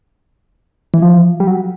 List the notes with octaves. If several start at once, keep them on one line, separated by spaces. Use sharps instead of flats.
E3
F3
G3
F#3